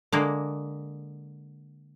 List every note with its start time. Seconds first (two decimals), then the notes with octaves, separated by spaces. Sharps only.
0.12 D3 G#3 A#3